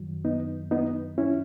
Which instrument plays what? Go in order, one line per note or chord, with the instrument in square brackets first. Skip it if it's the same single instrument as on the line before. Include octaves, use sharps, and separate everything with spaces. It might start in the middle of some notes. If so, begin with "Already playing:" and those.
Already playing: [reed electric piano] F#2 D#3 F#3
B3 D#4
B3 D#4
C#4 E4